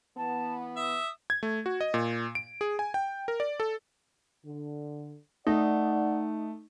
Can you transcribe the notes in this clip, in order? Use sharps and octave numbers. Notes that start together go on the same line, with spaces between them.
E3 B3 A5
E5 D#6
G#6
A3
F#4
D#5
A#2
D7
G#4
G#5
G5
A#4
D5
A4
D3
A3 D#4 D5 F#5